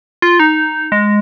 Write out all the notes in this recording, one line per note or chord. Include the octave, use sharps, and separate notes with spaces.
F4
D#4
G#3